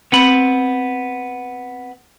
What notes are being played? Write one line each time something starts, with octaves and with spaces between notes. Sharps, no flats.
B3 C4 B5